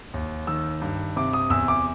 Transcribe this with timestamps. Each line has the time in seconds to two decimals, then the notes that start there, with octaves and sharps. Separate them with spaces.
0.14 D#2
0.47 D#3 E6
0.82 G2
1.17 C3 D6
1.33 D#6
1.50 E2 E6
1.68 D6